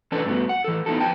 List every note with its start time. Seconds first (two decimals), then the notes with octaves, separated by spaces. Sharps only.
0.12 E3 C#4 D4 A4 B4
0.26 G2 A3 B3 F#4
0.49 F#5
0.64 E3 A4
0.86 B3 D#4 E4 F#4 A4
1.00 F2 B3 G5 A5